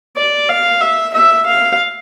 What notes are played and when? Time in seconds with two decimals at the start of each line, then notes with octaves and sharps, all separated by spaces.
0.17 D5
0.49 F5
0.81 E5
1.14 E5
1.46 F5